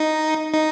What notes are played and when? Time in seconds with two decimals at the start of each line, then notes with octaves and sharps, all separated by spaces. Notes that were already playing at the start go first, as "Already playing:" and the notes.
Already playing: D#4
0.54 D#4